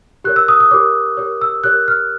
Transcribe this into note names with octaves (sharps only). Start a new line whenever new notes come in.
G4 A#4 C#5 F#6
E6
D#6
D#6
G4 A#4 C#5 D6
G4 A#4 C#5
E6
G4 A#4 C#5 F#6
F6